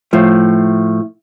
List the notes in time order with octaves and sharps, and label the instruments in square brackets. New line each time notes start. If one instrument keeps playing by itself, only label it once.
[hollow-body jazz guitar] A2 F3